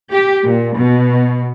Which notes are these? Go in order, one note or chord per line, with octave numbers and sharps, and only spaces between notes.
G4
A#2
B2